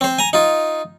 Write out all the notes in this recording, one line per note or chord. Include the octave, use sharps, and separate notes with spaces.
C4 C5
G#5 A#5
D#4 F4